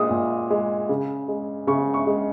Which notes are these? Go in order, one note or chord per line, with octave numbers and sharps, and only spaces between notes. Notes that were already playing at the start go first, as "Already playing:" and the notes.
Already playing: A#2 G#3 D#6
A#2
G#3
C#3
G#3
C#3 C#6
C#6
G#3